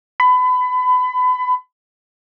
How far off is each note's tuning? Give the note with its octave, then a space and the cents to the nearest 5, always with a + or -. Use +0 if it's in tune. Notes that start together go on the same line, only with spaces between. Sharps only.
B5 +30